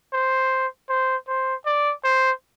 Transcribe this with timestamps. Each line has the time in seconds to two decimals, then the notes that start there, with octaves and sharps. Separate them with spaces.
0.13 C5
0.89 C5
1.28 C5
1.66 D5
2.04 C5